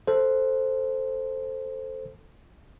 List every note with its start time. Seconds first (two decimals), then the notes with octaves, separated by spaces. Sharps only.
0.07 A4 C5